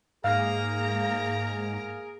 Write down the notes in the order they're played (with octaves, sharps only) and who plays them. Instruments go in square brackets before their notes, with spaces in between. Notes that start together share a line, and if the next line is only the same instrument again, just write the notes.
[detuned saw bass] G#2 [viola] A#3 A#5 [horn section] G#4 A#4 [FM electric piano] F5 F6